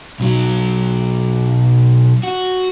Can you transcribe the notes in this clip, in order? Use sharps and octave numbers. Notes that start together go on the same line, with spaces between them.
B1 F#3
F#4